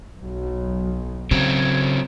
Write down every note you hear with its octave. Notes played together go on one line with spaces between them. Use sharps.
B1 F#3
C#3 F#3 C4 G#6